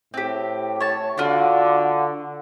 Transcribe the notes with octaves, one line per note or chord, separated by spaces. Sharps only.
A2 C4 G4
C#5 A5
D3 F4 F#4 D5